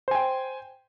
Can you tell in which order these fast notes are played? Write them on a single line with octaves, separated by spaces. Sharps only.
C5 G#5 G5